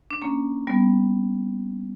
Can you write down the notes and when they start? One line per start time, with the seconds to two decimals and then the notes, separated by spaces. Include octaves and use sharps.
0.11 D4
0.22 A#3 C#4
0.67 G3 B3